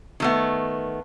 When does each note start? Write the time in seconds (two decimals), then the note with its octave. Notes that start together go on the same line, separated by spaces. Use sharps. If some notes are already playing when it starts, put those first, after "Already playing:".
0.20 D#3 A3 B3